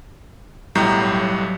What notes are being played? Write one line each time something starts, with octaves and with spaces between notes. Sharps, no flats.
B1 A2 F#3 G3 A#5 G6